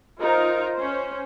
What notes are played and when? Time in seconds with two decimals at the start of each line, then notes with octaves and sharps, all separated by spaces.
0.20 D#4 F4 A#4 C5 A#5
0.76 C#4 C5